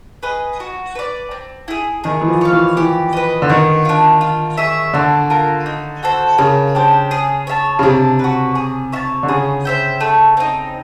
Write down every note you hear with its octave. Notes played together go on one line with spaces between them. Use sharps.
G#4 B4 D#5
F#4
B4 D5
C4
E4 G#4
D#3 G#4
E3
F3
C#5 F5
E3
E3 G4
B4 D#5
D3
D#3 B3
D4 F4
F4
G#4 C#5 E5
D3 D4
F4 A#4
D#4
F#4 A4 C5
C#3 A#3
D4 G4 C5
G#4
C#5 E5 A5
C#3
C3 D4
F#4 B4
G#4
C#5 E5 A5
D3
C#3 G#4
C5 E5 G5
A3
C4 D#4